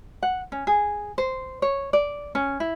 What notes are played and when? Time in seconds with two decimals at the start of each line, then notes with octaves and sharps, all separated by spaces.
0.23 F#5
0.52 C#4
0.67 G#4
1.18 C5
1.62 C#5
1.93 D5
2.35 C#4
2.60 E4